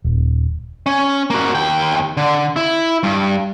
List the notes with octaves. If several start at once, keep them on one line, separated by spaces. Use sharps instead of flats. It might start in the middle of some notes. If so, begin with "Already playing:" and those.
D#1
C#4
A#3 F#4
D#2 G5
D3
E4
G2